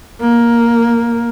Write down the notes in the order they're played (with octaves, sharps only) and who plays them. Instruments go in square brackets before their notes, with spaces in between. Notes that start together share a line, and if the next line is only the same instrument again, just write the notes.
[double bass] A#3